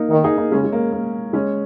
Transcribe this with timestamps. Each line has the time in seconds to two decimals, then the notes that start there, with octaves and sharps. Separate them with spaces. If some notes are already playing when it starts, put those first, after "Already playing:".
Already playing: A#3 D#4
0.10 D#3 A#3 D#4
0.24 D#4 G#4
0.37 A#3 D#4
0.51 C#3 G#3 C#4
0.64 G#3
0.72 A#3
0.92 A#3
1.33 G#3 C#4